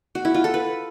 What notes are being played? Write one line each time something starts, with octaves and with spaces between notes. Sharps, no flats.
F#4
E4
F4
A4
B4